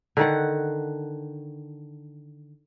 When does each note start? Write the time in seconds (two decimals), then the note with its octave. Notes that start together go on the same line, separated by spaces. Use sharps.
0.17 D3 D#3 F#5